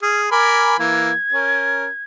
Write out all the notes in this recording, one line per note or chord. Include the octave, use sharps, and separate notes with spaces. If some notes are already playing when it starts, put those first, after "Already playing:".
G#4 F6
A#4 G#5 B5 D6
E3 A#3 G#6
C#4 A#4